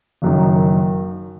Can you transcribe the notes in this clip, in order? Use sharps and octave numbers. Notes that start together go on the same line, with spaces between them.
F#1 F#2 D#3